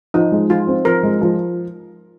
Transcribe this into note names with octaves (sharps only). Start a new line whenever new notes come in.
F3 D#4
G#3
F3 F4
C4
F3 A#4
G#3
F3